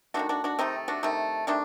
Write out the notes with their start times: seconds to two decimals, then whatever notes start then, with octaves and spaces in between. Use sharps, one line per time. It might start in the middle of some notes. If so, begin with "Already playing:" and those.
0.14 D#3 F#3 A3 D4 F#4
0.29 D4 F#4
0.44 D4 F#4
0.59 C3 D#3 A3 C4 D#4
0.88 D4 F#4
1.03 C3 D#3 A3
1.47 C3 D#3 A3 D4